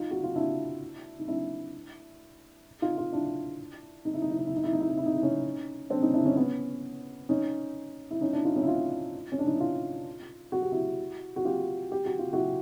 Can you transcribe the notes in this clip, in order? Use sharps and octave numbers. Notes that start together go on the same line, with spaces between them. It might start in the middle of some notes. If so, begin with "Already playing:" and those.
Already playing: D#4 F4
F#4
F4
D4 E4
D#4
D4 E4
D#4 F4
D#4 F4
D4 E4
D#4
E4
D#4
E4
D#4
E4
D#4
E4
D#4
E4
D#4
E4
D#4
E4
C#4 D#4
C4 D4
C#4 D#4
D4 E4
C#4 D#4
B3 C#4
C#4 D#4
E4
C#4 D#4
D4 E4
D#4 F4
C#4 D#4
E4
D#4 F4
C#4
D4
D#4
E4
D#4 F4
F#4
G4
E4 F#4
F#4
F4 G4
G4
F#4
F4
E4 F#4